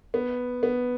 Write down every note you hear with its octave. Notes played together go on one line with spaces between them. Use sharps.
B3
B3